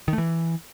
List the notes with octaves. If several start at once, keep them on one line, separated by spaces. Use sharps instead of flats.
D#3
A3
E3